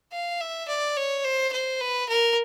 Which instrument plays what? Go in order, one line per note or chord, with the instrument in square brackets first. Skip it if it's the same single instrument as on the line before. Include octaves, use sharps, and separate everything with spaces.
[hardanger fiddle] F5
E5
D5
C#5
C5
C5
B4
A#4